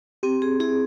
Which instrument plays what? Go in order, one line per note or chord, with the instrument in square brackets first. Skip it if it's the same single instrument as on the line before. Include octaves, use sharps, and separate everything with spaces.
[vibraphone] C4 [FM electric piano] G4
[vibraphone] G#4
[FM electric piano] E4 [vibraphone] G#4